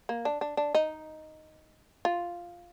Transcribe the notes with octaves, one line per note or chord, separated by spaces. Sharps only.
A#3
D4
D4
D4
D#4
F4